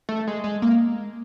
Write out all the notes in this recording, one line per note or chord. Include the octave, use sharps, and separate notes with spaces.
A3
G#3
G#3
A#3